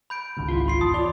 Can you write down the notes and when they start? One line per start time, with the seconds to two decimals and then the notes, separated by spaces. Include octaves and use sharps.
0.10 B5 G6 D7
0.37 G#1 C#2 G#2
0.48 E4 F4
0.68 F4 C6 C7
0.81 E2 A5 D#6
0.94 F4 C#5 D5